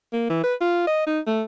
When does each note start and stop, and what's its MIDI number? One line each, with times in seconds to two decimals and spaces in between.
0.13 0.28 58
0.29 0.43 52
0.43 0.54 71
0.61 0.84 65
0.87 1.05 75
1.07 1.20 63
1.27 1.42 57